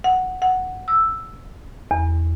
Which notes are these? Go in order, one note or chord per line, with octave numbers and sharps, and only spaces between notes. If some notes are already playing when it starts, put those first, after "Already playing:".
F#5
F#5
E6
E2